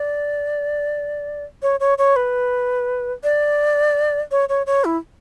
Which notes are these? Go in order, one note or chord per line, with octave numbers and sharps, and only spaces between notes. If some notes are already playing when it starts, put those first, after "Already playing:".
Already playing: D5
C#5
C#5
C#5
B4
D5
C#5
C#5
C#5
E4